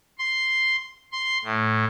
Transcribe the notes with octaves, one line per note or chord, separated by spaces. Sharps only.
C6
C6
A2